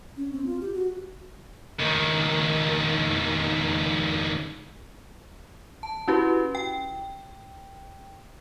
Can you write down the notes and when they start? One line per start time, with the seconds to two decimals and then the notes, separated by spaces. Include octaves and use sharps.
0.17 C#4
0.33 C4
0.46 F4
0.61 G4
0.74 F#4
1.79 C#2 D#3
5.83 A5
6.08 C#4 E4 F#4 G4 B4
6.55 G5